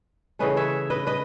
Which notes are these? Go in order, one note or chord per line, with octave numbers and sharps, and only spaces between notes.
C#3 E3 A3 C#4 B4 D#5
C#5 E5
B4 D#5
B4 D#5